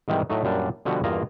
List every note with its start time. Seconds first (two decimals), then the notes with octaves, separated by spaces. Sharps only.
0.08 G#2 C3 D#3 E3 G3
0.30 A2 F#3 A3 D#4
0.44 F#2 A#2 G3 D4
0.85 B2 D3 F3 G3 B3 F#4
1.04 E2 G2 A#3 F4 D#5 A#5